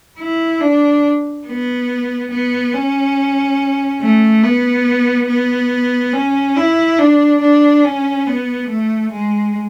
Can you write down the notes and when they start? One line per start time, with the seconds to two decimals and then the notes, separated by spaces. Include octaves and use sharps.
0.19 E4
0.61 D4
1.47 B3
2.32 B3
2.74 C#4
4.01 A3
4.44 B3
5.28 B3
6.13 C#4
6.57 E4
6.99 D4
7.41 D4
7.84 C#4
8.27 B3
8.69 A3
9.12 G#3